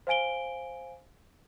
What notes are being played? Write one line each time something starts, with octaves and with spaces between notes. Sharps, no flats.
C5 F5 G#5 D7 G7